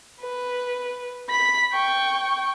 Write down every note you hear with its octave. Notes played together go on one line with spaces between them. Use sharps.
B4
B5 B6
G5 C#6